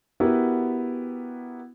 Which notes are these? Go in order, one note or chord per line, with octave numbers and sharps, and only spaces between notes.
B3 E4 F#4 G4 A#4 B4